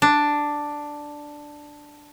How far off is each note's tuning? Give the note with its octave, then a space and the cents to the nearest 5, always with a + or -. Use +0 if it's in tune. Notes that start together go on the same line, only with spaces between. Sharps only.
D4 +5